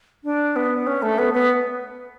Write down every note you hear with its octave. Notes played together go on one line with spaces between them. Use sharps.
D4
B3
C#4
A3
B3
B3